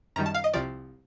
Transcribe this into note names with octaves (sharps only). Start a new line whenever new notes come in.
F#2 D#3 G3 A#5
A5
F5
D#5
C2 C3 F3 D5